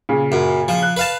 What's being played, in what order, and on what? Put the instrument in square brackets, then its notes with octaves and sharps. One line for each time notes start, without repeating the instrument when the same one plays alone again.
[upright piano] A#2 C#3
[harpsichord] F#2
F3
[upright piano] F#6
[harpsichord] B4 F5 A5